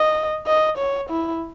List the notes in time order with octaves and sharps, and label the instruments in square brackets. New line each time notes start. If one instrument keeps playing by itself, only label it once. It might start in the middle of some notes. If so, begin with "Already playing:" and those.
Already playing: [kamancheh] D#5
D#5
C#5
E4